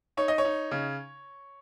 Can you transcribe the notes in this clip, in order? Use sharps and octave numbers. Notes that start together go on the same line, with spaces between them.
D#4 C#5
D#5
C#5
D#4
C#3